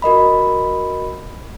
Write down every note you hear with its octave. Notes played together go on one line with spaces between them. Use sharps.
F#4 A#4 D#5 B5